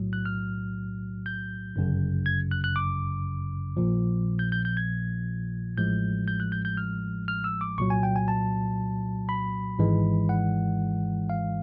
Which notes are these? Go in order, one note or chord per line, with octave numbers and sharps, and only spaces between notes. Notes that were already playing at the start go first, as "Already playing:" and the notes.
Already playing: B1 A2 F#3
F#6
F6
G6
G1 F#2 C#3
G#6
F#6
F#6
D6
A#1 A#2 F3
G6
G6
G6
G#6
A1 A2 F3 G#3 G6
G6
F#6
G6
G6
F6
F6
E6
D6
C2 A#2 F#3 C#6
G#5
G5
G#5
A5
B5
G#1 G#2 E3 G#3
F#5
F5